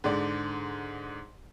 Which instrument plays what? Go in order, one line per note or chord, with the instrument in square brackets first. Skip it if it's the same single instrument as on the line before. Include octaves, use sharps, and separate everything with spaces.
[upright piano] G#2 D3 D5